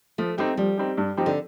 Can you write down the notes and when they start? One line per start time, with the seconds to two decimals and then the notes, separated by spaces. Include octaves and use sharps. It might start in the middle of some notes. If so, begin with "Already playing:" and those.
0.18 F3 A3
0.38 A3 C4 D#4 G4
0.57 F3 G3
0.77 C4 D#4 G4
0.98 G2
1.17 F3 C4 D#4 G4
1.26 D3